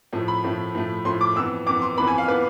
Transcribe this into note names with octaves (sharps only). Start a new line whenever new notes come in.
A2 F3 A3
B5
A2 F3 A3
A2 F3 A3
A2 F3 A3 C6
D6
F2 E3 B3 E6
F2 E3 B3 D6
C6
F2 E3 B3 B5
G#5
F5
E3 B3 B4